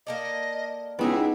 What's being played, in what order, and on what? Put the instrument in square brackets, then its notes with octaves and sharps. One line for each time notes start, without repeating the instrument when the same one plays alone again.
[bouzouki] A#3 A4 D5 [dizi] D#5
[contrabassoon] C#2 [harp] B3 D#4 [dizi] E4 [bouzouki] G4 G#4